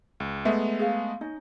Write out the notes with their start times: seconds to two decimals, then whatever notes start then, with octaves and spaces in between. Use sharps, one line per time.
0.20 C#2 B5
0.45 G#3 A3 B3 E5
0.79 G#4 F5
1.21 C#4 D#4 D#5